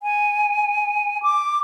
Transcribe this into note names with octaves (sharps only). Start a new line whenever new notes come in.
G#5
D6